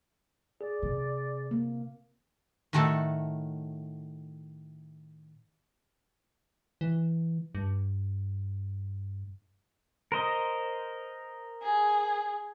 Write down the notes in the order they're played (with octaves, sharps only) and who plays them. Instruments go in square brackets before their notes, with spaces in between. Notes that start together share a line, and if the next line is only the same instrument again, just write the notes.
[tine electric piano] G#4 [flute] D5
[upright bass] C3
[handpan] A#3
[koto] A2 D#3 A3 F#4 A4
[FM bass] E3
G2
[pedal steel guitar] A#4 C5 D#5
[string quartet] G#4